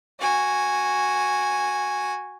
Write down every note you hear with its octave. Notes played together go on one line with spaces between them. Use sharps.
F#4 G#5